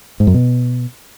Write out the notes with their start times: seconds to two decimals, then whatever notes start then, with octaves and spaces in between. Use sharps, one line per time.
0.20 G#2
0.27 F#2
0.34 B2